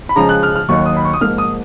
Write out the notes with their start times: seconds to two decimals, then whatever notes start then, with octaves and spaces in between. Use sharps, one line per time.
0.09 B5
0.16 C#3 F3 G#3 A#5
0.29 F#6
0.43 F6
0.55 F6
0.68 D#2 D#3 F#3 C#6
0.86 D#6
0.97 B5
1.05 C#6
1.13 D#6
1.21 G#2 F3 A#3 F6
1.38 D#6